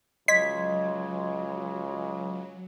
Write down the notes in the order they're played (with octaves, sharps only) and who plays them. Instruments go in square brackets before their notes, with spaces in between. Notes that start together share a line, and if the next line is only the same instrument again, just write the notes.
[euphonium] C#2 [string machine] F#3 [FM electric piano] D#5 C6 G#6 [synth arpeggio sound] B6